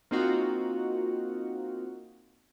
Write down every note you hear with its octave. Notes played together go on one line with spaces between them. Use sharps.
A#3 C4 D#4 F4 F#4